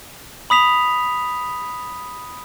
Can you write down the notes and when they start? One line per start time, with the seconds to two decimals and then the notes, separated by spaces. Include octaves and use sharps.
0.50 B5 D#6 B6 F7